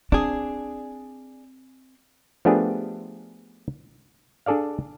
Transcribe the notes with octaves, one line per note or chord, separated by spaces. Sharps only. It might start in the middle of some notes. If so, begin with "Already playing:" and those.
C4 D4 G#4
F3 A3 B3 D4 G4 G#4
D4 G#4 A4 D5 F5